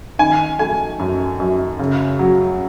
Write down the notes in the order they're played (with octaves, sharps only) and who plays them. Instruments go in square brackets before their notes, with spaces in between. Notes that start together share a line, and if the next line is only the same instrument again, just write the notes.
[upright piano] D#3 G#5
A3 G#5
F#2
F#2
C#3
F#3